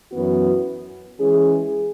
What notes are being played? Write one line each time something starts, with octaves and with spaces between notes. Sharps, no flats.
F#2 E3 B3 F#4
E3 G#3 C#4 G#4